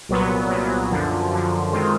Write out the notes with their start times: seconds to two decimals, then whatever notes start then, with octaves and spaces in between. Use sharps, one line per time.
0.09 C2 A#2 F#3 B3
0.50 C2 A#2 F#3 B3
0.91 F#2 D3 F3
1.32 F#2 D3 F3
1.72 D#3 G#3 C4 F4